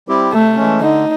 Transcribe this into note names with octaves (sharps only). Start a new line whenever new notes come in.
G3 C4 E4 G4
C3 A3
E3 G#3 C#4
D3 D#4